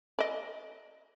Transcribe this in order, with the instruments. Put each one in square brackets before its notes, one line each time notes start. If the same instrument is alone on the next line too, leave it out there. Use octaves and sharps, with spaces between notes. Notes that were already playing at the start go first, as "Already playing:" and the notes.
[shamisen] D5 D#5